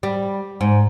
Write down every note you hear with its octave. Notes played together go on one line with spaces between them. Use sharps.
G3
G#2